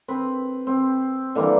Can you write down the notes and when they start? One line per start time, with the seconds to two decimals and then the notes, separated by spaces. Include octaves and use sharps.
0.08 C4 B4
0.67 C4
1.35 D3 E3 G3 A#3